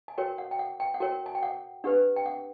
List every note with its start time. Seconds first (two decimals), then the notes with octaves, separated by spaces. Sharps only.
0.08 G#5
0.18 F#4 A#4 C#5 G5
0.38 F#5
0.51 G5
0.59 F#5
0.80 G5
0.94 F#5
1.00 F#4 A#4 C#5 G5
1.26 G#5
1.35 G5
1.43 F#5
1.84 D4 G4 B4 F#5
2.16 G5
2.26 F#5